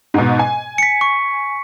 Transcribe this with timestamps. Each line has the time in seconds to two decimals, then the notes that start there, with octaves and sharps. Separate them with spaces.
0.14 G#2 B2
0.39 G#5
0.78 B6 C#7
1.01 C#6